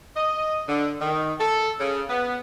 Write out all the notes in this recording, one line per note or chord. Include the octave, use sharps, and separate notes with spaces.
D#5
D3
D#3
A4
C#3
B3